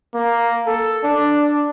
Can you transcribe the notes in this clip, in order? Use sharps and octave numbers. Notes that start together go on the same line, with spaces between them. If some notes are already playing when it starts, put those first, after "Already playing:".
A#3
A4
D4